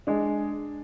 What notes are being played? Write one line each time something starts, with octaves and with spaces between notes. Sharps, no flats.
G#3 D4